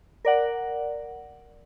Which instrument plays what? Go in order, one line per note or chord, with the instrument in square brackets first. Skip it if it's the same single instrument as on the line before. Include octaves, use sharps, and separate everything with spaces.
[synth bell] A#4 D5 F#5